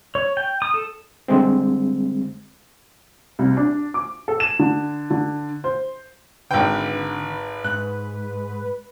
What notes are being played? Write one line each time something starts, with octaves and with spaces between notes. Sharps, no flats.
C#5
G5
D#6
A4
D3 G3 G#3 C4
C2
D4
D6
A4
E7
D3
D3
C5
G#1 D3 B4 G5
G#2 F#6